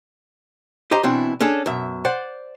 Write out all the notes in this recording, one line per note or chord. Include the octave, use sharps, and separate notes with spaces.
G4 C5 D#5 A#5
B2 E3 C4 D4 E4
C#4 D4 G#4 A4
F#2 B2 E5
C5 D5 F#5